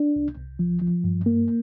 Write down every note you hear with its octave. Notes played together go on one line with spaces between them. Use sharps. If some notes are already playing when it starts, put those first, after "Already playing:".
Already playing: D4
C2
C2
F3
F3
G2
A#3